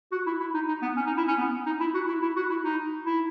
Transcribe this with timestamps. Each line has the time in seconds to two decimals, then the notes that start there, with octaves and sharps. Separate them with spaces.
0.12 F#4
0.26 E4
0.40 E4
0.54 D#4
0.68 D#4
0.82 B3
0.96 C#4
1.07 D#4
1.17 E4
1.28 C#4
1.38 B3
1.66 D#4
1.80 E4
1.94 F#4
2.08 E4
2.22 E4
2.36 F#4
2.50 E4
2.64 D#4
3.06 E4